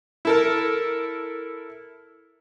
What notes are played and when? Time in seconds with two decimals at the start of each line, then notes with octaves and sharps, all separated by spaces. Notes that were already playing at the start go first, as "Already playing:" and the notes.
0.25 E4 A4 A#4